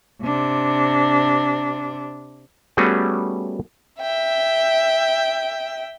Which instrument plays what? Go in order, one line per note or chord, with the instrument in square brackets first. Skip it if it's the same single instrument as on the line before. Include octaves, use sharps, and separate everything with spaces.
[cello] C3 D4
[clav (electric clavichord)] G3 A3 B3 C#4 F#4 G#4
[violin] E5 G5